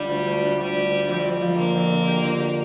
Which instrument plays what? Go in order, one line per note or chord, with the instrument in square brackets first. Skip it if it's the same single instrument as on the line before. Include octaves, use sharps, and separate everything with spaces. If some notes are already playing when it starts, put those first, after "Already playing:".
Already playing: [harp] D3 D4 F4 [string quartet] G3
[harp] D2
D2
D4
[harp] D2 [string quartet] G3
[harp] D2
D4
[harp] F2 [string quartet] G3
[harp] F2
F3
[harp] D3 [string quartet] A#3
[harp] F2
D3
G4
D3
G4